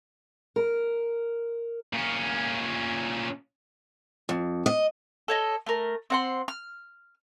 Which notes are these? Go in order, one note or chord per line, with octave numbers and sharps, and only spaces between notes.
A#4
A#2 C#4
F2
D#5
A4 C#5 D#5
A3 A#4
C4 F#5 C6
F6